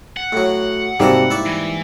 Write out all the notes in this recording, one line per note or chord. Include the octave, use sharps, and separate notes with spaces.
F#5
A2 F#3
G#2 C3 G3 A#3 F#4 A4
E4 D5 C#6
E3